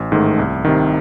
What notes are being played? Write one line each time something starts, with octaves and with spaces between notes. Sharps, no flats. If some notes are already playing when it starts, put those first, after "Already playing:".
Already playing: A1
G#2 D#3 A3
C2
C3 D#3